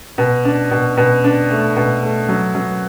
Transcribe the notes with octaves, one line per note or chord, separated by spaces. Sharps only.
B2
D4
B2
B2
D4
A3
B2
A3
F#3
F#3